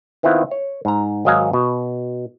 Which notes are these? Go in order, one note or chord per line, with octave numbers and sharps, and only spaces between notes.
D#3 B3 C4 E4 F4
C#5
G#2 A#5
G#1 F#3 D#5 F5 G#5 A#5
B2